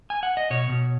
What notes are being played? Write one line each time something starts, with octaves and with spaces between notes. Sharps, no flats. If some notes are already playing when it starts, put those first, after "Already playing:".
G#5
F#5
D#5
B2 C#5
B2